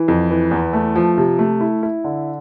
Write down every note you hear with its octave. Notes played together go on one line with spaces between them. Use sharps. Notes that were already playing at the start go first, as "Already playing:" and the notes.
Already playing: E3
F2
E3
E2
A3
F3
C3
A3
E4
E4
D3